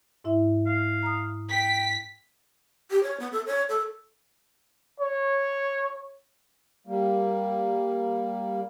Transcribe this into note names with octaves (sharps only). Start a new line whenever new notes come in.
G#2 E4 E5
F5
A#5 D#6
G5 B6
G4
C#5
B3
A4
C#5
A4
C#5
G3 A#3